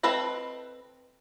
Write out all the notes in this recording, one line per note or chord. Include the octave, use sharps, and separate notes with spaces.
C4 A4 B4 D#5